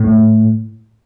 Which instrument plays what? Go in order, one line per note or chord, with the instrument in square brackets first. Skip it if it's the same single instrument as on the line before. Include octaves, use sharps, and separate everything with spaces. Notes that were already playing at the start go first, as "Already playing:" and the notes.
Already playing: [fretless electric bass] A2